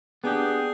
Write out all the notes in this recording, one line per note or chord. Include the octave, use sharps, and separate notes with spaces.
B3 D4 G4 G#4